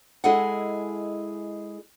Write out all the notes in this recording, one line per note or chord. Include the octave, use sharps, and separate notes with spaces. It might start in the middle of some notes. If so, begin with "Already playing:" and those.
G#3 E4 G#4 A4 D#5 F#5